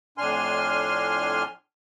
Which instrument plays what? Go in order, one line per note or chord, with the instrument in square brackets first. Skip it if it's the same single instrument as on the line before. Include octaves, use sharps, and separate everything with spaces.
[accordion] F2 A2 D4 G#5 C6 F6